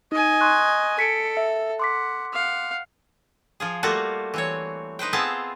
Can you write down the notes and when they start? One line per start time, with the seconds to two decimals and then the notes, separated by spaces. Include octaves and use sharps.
0.12 D#4 D#5 G#5
0.41 C6 C#6 F#6
0.99 A4 B6 C#7 D7
1.37 E5
1.80 F#5 C6 D6 B6
2.33 F5 F#5
3.60 F3 F4 G#4
3.83 G3 A3 A#3 F4 F#4
4.34 E3 C4 C#5
4.99 D#4 B4 C5 G5
5.13 B3 C4 F4 G#4 E5 A5